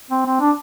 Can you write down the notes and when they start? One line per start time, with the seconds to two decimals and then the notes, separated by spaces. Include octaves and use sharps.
0.11 C4
0.25 C4
0.40 D4